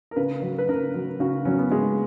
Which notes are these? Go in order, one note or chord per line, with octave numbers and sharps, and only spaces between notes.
A#4
C#3 B4
F#3
B4
C#3 A#4
F#3
C#3 F#4
F#3 C#4
B3
C#3 G#3